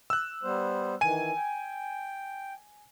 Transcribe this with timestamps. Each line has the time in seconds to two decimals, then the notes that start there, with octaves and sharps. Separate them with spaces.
0.10 E6 F#6
0.43 G3 B3 C5
1.01 D#3 E3 G#5 D#7
1.35 G5